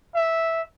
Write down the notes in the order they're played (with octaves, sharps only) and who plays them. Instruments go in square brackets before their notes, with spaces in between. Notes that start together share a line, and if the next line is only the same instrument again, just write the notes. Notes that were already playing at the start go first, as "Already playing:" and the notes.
[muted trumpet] E5